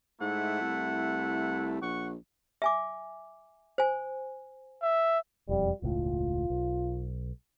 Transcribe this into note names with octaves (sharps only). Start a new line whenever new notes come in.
G#2 A3 E4 F#5
C2
A#1 F#5 C#6
E5 G#5 D6
C5 G#5
E5
E1 F2 G3
E1 C#2 A2 F4
B1